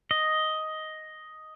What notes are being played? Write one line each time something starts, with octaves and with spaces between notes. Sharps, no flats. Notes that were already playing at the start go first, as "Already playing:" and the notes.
D#5